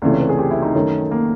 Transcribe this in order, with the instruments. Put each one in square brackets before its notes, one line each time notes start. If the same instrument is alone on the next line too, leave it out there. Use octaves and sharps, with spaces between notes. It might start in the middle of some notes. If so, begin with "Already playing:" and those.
[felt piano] C#2 C3 E3 A3 [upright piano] D5
[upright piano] C#5
B4
G#4
G4
E4
D#4
[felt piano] F#2 D#3 F#3 A3 C#4
[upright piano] A#3